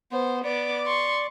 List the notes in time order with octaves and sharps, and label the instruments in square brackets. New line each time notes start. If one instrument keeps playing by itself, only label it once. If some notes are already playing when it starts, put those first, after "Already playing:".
[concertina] B3 [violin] C5
[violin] B3 D6 [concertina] D5
[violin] C6 C#6